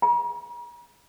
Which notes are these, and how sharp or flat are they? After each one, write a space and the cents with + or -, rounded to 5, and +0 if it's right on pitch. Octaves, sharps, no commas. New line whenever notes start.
A#5 +45